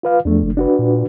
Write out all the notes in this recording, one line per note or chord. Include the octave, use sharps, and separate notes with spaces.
F4 B4 F5
E2 F3 A3 D4
F#1
D4 F#4 B4
A#2